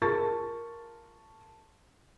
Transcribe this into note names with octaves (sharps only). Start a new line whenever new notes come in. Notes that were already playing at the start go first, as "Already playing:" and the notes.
F4 G#4 A#4 A5 C#6 A6